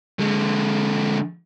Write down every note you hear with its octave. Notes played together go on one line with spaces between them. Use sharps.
D3 G#3